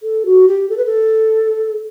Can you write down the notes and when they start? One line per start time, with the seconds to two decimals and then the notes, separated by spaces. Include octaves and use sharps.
0.03 A4
0.26 F#4
0.48 G4
0.70 A4
0.77 B4
0.86 A4